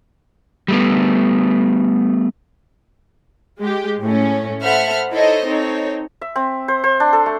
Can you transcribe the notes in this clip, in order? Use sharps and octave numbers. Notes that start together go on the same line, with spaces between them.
G3 A3 B3
G#3 G4
A2 A3 C#4
A4 C5 E5 F#5 B5 F6
D#4 E4 A4 C5 C#5 D#5
C4 D#4 A4 C#5
E5
C4
C5
C5
D4
A4
A3